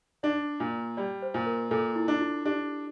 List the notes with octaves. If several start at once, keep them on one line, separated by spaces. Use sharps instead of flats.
D4 D5
A#2
G3 D5
C5
A#2
A#4
A#2 A4
E4
D4
F4
D4 G4